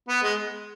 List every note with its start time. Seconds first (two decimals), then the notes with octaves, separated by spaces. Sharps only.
0.09 B3
0.23 G#3